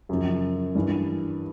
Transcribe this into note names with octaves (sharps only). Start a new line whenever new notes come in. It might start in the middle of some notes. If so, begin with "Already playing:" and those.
F#2 C#3 F3
G2 E3